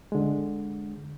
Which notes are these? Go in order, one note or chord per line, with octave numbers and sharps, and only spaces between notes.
D3 G#3